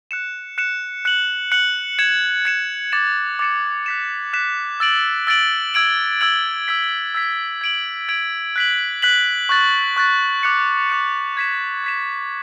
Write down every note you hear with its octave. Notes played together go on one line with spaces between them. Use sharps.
F#6 C#7 E7
F#6 C#7 E7
F#6 C#7 F#7
F#6 C#7 F#7
G#6 C#7 E7
G#6 C#7 E7
D6 A6 C#7 E7
D6 A6 C#7 E7
F#6 B6 E7
F#6 B6 E7
E6 A6 D7 F#7
E6 A6 D7 F#7
E6 G#6 D7 F#7
E6 G#6 D7 F#7
E6 G#6 B6
E6 G#6 B6
G#6 D7 F#7
G#6 D7 F#7
F#6 B6 F#7
F#6 B6 F#7
C#6 F#6 A6
C#6 F#6 A6
D6 F#6 C#7
D6 F#6 C#7
G#6 B6 E7
G#6 B6 E7